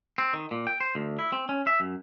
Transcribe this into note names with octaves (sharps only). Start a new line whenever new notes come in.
C4
D#3
A#2
G5
C5
D2
E4
C4
C#4
E5
F#2